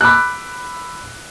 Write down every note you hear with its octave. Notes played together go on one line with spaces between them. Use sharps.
B5 D6 E6 F#6